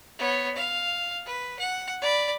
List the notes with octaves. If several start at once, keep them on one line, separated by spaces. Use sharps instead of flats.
B3 C#5
F5
B4
F#5
D5 B5